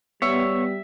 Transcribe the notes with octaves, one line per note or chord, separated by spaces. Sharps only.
G3 B3 C#5 E5